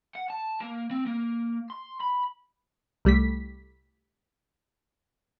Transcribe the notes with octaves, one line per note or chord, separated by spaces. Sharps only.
F#5
A5
A#3
C4
A#3
C6
B5
C2 G3 A3 B6